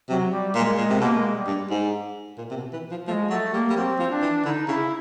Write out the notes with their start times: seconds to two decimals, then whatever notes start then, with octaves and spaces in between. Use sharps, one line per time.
0.09 C3 F#3
0.32 G3
0.55 A#2 G#3
0.78 A#2 G#3
0.90 C3
1.01 B2 A#3
1.18 G#3
1.36 G3
1.47 G2
1.71 G#2
2.38 A#2
2.51 C3
2.57 B2
2.73 E3
2.91 F3
3.07 F3 A3
3.12 G#3
3.30 F#3 A3
3.53 G3 A#3
3.70 G3
3.77 F#3 C4
3.99 F3
4.11 D4
4.22 E3
4.45 D3 E4
4.50 D#4
4.67 C#3 E4